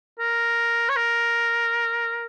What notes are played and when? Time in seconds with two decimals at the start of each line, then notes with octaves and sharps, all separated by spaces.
0.19 A#4
0.89 C#5
0.96 A#4